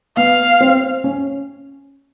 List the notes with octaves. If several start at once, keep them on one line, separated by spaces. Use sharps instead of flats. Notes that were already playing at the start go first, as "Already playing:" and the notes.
B3 F5
C4
C#4